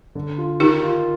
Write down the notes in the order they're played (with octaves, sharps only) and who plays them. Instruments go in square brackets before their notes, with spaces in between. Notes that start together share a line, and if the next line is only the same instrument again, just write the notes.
[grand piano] D3
F4
[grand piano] D#3 [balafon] D#4 G4
[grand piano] F4